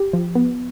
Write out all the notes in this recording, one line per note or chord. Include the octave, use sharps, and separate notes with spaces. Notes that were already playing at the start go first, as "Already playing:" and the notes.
Already playing: G4
F3
B3